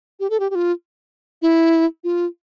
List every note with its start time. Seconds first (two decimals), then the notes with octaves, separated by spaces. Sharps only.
0.20 G4
0.30 A4
0.40 G4
0.50 G4
0.55 F4
1.42 E4
2.04 F4